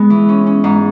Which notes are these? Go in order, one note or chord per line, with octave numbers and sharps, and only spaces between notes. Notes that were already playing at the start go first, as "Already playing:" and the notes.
Already playing: G#3 B3
E3
C#4
C#4
G#2